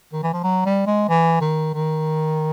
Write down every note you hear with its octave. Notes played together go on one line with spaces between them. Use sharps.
D#3
E3
F3
F#3
G3
G#3
E3
D#3
D#3